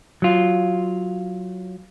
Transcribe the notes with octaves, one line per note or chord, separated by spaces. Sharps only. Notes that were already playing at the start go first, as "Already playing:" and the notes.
F#3 F4